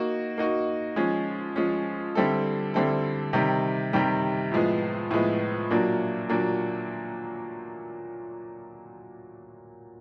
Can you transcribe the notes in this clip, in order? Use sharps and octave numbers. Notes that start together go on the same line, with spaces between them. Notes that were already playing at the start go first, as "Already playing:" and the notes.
Already playing: A#3 D#4 F#4
A#3 D#4 F#4
F3 G#3 C#4
F3 G#3 C#4
D3 G3 C4 E4 A4
D3 G3 C4 E4 A4
C3 D#3 G3
C3 D#3 G3
A2 F3 G#3 B3
A2 F3 G#3 B3
A#2 F#3 A#3 D4
A#2 F#3 A#3 D4